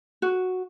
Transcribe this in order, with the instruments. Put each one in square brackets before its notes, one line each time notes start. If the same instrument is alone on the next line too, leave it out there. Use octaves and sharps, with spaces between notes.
[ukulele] F#4